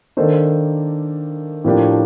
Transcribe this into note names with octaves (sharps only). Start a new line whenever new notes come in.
D#3 A#3 D4 A4 C5
A2 F3 A#3 D4 G4